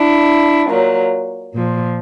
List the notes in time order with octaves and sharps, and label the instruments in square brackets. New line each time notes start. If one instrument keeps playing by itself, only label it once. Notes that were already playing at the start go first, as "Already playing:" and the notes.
Already playing: [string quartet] D4 E4
A#2 F#3
A#2 F3